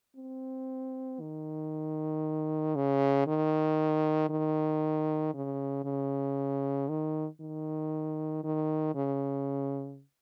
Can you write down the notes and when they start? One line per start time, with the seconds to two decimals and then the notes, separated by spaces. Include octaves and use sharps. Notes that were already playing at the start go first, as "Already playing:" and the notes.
0.16 C4
1.20 D#3
2.76 C#3
3.27 D#3
4.29 D#3
5.34 C#3
5.85 C#3
6.89 D#3
7.41 D#3
8.44 D#3
8.95 C#3